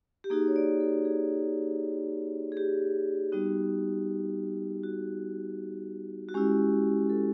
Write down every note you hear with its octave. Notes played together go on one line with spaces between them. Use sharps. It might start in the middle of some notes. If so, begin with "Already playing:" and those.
G4
A#3 D#4 F#4 G#4
C#5
D5
A4
G#4
G#4
G4
G3 B3 D#4 F#4
F#4
F#4
G#3 C#4 E4 G4
A4